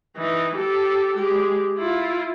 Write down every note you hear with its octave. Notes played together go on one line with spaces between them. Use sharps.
E3 D#4
G4 A4
G#3 G4
E4 F4